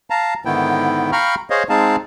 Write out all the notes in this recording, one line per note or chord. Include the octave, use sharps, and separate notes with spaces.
F5 A5 A#5
G#2 D3 D#3 B3 E4 G5
F5 G5 A#5 B5 C#6 F6
G#4 C5 C#5 D#5 F5
G#3 C4 D#4 G#4 F5 A5